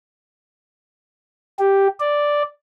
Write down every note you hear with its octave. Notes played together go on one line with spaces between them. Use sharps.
G4
D5